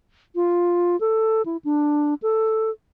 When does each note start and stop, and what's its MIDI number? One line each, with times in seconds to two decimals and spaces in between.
0.35 0.99 65
1.00 1.42 69
1.46 1.57 64
1.65 2.14 62
2.22 2.70 69